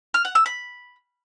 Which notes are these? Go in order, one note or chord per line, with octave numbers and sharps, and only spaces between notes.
F6
F#5
E6
B5